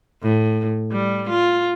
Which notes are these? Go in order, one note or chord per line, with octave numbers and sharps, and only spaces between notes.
A2
G3
F4